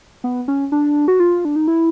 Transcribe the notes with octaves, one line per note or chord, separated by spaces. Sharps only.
B3
C#4
D4
F#4
F4
D4
D#4
E4